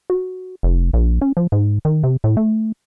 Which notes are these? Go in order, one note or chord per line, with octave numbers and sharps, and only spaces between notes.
F#4
F1
A#1
C#4
F3
G#2
D#3
C3
A2
A3